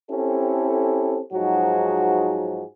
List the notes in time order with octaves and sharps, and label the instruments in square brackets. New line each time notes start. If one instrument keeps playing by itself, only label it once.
[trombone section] C4 C#4 E4 G4 A4
G#2 F3 F#3 D#4 F#4 G#4